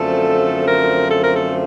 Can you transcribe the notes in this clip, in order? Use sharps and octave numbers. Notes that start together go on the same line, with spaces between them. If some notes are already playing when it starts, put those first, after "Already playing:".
Already playing: F#2 D3 F3 A3 C4 A4
A#4
A4
A#4
A4